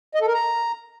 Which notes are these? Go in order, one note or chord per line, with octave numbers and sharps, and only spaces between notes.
D#5
A4
A#4
A#5